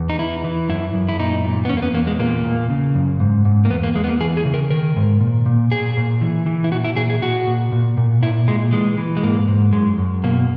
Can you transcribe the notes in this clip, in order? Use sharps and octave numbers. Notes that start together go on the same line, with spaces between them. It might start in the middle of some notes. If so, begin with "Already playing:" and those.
Already playing: E2
D#4
E3 E4
E3
F#2 E4
F#2
E4
A#2 D#4
A#2
B3
E2 C#4
A#3
B3
E2 A#3
G#3
A#2 A#3
A#2
C#3
F#2
G#2
G#2
A#3
E2 B3
A#3
E2 G#3
B3
A#3
E3 G#4
G#4
C#3
A#4
D#3 A#4
G#2
A#2
A#2
A#2 G#4
A#2
E3
E3
E4
A#2 F#4
E4
A#2 G#4
G#4
A#2 F#4
A#2
A#2
A#2
A#2 E4
A#2 G#3
E3 G#3
E3
G#3
G#2 A#3
G#2
F#2 G#3
F#2
B2 A#3